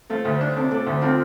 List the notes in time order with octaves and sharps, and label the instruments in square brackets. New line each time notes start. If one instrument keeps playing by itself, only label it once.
[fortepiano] A3 [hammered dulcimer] C5 F5
[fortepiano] D2
D4
[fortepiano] C3 [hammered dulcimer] A4 D5
[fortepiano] A3 [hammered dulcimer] A4 D5
[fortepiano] D2
[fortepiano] C4 [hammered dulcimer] F4 A4